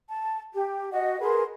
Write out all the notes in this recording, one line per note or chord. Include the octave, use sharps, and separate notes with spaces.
A5
G4
F#4 D#5 F#5
G#4 A#4 B4 C6